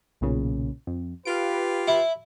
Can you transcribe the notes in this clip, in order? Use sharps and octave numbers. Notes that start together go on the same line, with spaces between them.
B1 A#2 C#3
F2
F4 G4 B4 F5 D7
E4